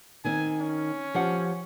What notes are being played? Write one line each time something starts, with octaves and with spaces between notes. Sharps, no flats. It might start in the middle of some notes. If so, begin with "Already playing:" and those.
D#3 C4 G#5
C#4
F3 G4 F#5